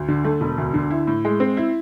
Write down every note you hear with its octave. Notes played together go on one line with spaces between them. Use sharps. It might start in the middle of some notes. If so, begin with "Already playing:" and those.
Already playing: D2
D3
A3
E1
D2
D3
E4
A2
G#3
C4
E4